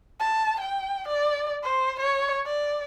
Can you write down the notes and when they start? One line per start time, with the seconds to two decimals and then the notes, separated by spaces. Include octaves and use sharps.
0.20 A5
0.60 G5
1.08 D5
1.63 C5
2.00 C#5
2.46 D5